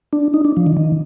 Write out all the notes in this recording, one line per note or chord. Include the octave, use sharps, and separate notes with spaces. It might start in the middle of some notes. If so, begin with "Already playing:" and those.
D4
D#4
D4
F3
D#3
D#3